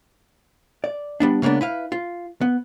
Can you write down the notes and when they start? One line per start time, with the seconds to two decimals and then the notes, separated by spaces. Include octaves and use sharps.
0.84 D5
1.20 G3 B3 D4
1.42 C#3 G#3 A#3 B3 D4
1.61 E4 B4 F5
1.92 F4
2.41 B3